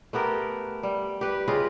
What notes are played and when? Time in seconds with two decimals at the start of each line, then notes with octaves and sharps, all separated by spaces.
0.13 A3 B3 G4 A#4
0.83 G3
1.21 G4 B4
1.48 C#3 F4 G4 D#5